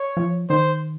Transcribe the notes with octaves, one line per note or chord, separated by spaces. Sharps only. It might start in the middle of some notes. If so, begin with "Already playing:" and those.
Already playing: C#5
F3
D#3 C5